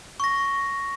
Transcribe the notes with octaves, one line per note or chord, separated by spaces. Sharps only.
C#6 A#6